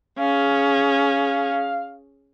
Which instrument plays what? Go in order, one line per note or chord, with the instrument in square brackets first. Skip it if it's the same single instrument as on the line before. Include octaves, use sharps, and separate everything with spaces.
[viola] C#4 G#4 [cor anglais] F5